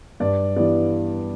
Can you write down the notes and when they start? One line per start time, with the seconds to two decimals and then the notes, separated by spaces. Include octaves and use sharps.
0.20 G2 D5
0.56 E3 G3 B3 D5